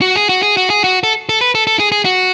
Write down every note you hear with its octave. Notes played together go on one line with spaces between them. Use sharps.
F#4
G#4
F#4
G#4
F#4
G#4
F#4
A4
A4
B4
A4
A4
G#4
G#4
F#4